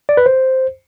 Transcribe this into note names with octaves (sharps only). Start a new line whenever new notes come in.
D5
B4
C5